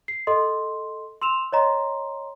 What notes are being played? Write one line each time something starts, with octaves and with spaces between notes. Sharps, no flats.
C7
A4 D#5 C6
C6 E6 E7 F7
C#5 D#5 A#5 C6